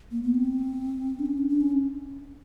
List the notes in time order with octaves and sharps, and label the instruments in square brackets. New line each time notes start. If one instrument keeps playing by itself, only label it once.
[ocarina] A#3
B3
C4
D4
C#4
D4
D4
C#4